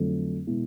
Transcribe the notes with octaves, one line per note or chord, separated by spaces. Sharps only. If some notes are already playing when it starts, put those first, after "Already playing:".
Already playing: F2 D3 F#3 A3
B2 G#3 B3 E4